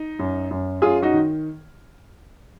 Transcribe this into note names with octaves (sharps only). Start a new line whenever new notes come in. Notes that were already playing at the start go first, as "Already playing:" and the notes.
Already playing: D#4
F#2
F#2
F#2 F4 G#4
D#4 F#4
D#3